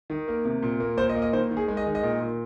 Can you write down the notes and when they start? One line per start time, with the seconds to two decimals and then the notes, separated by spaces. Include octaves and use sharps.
0.10 D#3
0.28 A#3
0.45 C3
0.63 A#2
0.80 A#3
0.97 A#2 C5
1.09 D#5
1.15 A#3
1.22 D#5
1.33 D#3 C5
1.51 D#3
1.57 G#4
1.68 G#3
1.77 D#5
1.87 D#3
1.95 D#5
2.03 A#2
2.21 A#2